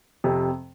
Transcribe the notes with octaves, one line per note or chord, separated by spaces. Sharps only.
F2 C3